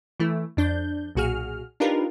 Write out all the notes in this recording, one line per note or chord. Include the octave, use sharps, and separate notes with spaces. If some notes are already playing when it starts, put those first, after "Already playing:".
E3 A3 E4
F2 D4 G6
B1 A#2 F#4 G#4 F6
D4 D#4 F4 G4 A#4 B4